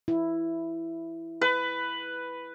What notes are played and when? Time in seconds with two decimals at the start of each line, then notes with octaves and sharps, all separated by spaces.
0.08 E4
1.41 B4